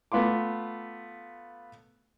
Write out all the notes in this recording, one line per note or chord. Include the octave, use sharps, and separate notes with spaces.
A3 B3 F4 C6 D6